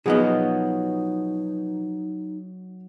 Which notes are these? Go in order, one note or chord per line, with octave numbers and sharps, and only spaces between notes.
B2 F3 F#3 B3 D#4 G#4 D#5